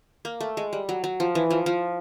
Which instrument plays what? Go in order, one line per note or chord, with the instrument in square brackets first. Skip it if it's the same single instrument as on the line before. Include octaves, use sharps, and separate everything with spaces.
[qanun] A#3
A3
G#3
G3
F#3
F#3
F3
E3
F3
F3